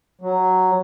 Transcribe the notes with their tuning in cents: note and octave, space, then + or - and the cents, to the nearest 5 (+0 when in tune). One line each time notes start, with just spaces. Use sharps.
F#3 +5